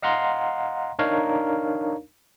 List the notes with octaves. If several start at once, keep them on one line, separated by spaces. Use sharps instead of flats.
D#5 F5 F#5 A#5 C6
D4 D#4 A#4 C#5 F5